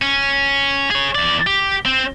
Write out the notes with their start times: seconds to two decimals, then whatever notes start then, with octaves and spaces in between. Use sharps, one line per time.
0.02 C#4
0.91 G#4 C#5
1.15 E2 D5
1.47 G4
1.85 C4